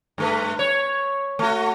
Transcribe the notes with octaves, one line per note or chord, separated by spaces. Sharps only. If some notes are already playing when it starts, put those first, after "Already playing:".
G2 A3 B4
C#5
A3 F#4